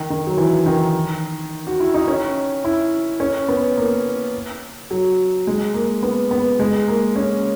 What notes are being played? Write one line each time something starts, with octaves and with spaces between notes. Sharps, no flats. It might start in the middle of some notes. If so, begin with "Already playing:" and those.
Already playing: D#3
D#3
F#3
E3
D#3
F#4
E4
D#4
C#4
E4
C#4
B3
A#3
F#3
G#3
A#3
B3
B3
G#3
A#3
C#4